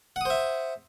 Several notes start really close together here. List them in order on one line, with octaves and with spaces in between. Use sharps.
F#5 D#6 C5 E5